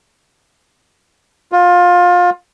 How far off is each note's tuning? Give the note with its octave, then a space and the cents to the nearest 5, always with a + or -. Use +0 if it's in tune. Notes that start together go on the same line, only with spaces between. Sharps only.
F4 +25